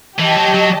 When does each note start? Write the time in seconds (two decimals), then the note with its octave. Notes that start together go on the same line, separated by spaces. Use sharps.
0.19 E3 G4 D#5 A5
0.36 F#3
0.54 F#3